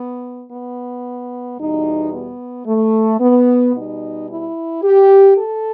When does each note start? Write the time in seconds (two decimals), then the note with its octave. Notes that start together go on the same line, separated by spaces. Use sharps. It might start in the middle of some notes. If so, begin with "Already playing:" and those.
Already playing: B3
0.50 B3
1.58 E2 B2 G3 D#4
2.13 B3
2.66 A3
3.20 B3
3.74 B2 G3 D#4
4.28 E4
4.83 G4
5.37 A4